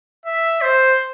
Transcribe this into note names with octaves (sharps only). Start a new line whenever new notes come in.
E5
C5